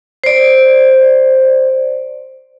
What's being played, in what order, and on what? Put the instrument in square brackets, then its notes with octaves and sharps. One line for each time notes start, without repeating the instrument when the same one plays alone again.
[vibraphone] C5 D5